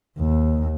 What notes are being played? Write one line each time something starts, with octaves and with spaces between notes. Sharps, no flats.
D#2